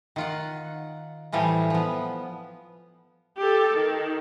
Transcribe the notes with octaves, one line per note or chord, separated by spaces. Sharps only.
D#3 F4 F#5
A2 E3 F3 G3 G#5
F3 B3
G4 A4
D#3